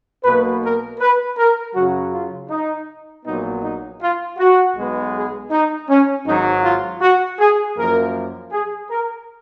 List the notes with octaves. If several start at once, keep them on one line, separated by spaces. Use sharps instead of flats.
B1 B2 A#3 B4
A#4
B4
A#4
F#2 C#3 F#3 F#4
F4
D#4
A#1 A#2 F#3 B3 D#4
D#4
F4
F#4
B1 B2 G#3 B3
G#4
D#4
C#4
G#1 G#2 F#3 D#4
F4
F#4
G#4
F#2 F3 A#3 A#4
G#4
A#4